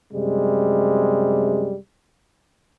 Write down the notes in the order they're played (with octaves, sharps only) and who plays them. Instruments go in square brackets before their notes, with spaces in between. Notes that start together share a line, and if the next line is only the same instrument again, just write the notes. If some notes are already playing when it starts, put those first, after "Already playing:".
[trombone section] F#2 C3 G3 G#3